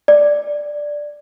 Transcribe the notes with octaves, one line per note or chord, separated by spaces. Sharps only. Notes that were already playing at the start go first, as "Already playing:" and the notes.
D5